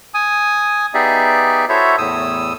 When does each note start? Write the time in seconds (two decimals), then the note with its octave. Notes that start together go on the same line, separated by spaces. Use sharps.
0.14 G#5 D#6
0.94 B3 D#4 G4 G#4 D5 E5
1.69 E4 F#4 A4 C5 C#5 E5
1.98 E2 A2 D#6 E6